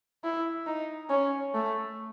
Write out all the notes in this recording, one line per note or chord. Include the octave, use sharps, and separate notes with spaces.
E4
D#4
C#4
A3